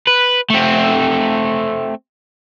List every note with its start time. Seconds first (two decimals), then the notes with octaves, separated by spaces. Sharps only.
0.07 B4
0.50 A3 C4